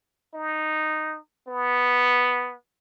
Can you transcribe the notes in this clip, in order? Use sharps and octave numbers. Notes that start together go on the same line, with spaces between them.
D#4
B3